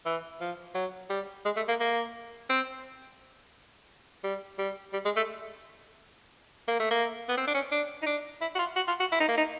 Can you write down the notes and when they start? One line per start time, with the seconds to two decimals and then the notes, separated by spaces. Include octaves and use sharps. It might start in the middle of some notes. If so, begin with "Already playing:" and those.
0.06 E3
0.41 F3
0.75 F#3
1.10 G3
1.45 G#3
1.56 A3
1.68 A#3
1.80 A#3
2.50 C4
4.24 G3
4.58 G3
4.93 G3
5.05 G#3
5.16 A3
6.68 A#3
6.80 A3
6.91 A#3
7.29 B3
7.37 C4
7.47 D4
7.54 C#4
7.71 D4
8.02 D#4
8.06 D4
8.41 E4
8.55 F#4
8.59 F4
8.76 F#4
8.88 F4
9.00 F#4
9.12 E4
9.20 D#4
9.29 A#3
9.37 D#4